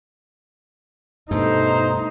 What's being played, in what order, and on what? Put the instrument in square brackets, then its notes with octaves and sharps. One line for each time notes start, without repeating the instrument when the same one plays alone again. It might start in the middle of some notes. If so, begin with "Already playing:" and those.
[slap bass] G2 B2 [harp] A3 [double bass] D#4 [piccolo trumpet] C5